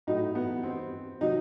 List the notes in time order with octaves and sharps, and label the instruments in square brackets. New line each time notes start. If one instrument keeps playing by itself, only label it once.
[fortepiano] A2 F#3 D#4
B3
C4
C3 F#3 D#4